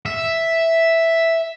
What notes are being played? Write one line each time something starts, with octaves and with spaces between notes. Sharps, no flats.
E5